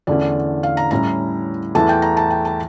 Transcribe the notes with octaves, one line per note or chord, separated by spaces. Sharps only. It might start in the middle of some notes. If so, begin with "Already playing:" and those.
E2 D3 A3 C#4 D5
F5
A#5
A2 G3 C#4 A#5
E2 E3 A3 A5
G5
A#5
A5
G5
A5